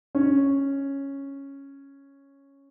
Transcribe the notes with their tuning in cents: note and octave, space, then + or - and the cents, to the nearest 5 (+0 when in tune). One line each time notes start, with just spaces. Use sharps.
C#4 -5